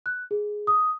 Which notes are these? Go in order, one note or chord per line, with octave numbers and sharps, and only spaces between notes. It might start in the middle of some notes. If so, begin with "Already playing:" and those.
F#6
G#4
D#6